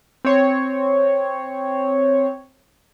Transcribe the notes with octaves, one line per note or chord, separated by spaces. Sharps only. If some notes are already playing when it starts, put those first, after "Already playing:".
C4 C#5